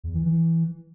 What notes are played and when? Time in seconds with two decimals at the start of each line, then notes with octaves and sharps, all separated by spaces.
0.04 E2
0.14 E3
0.25 E3